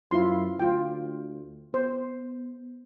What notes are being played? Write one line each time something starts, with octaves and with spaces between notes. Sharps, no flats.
F#2 E4 F4 C6
D2 F4 G5
B3 C5